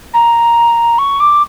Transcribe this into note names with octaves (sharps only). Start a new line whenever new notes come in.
A#5
C#6
D6